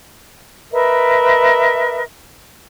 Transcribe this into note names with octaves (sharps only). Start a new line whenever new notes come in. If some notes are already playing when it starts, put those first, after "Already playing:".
A#4 B4 D#5 E5